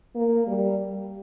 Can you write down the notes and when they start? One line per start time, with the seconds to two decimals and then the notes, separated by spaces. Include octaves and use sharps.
0.15 A#3
0.47 G3